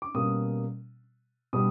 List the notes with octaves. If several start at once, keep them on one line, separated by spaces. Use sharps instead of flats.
D6
B2 G3 A#3 C#4 D#6
B2 G3 D#6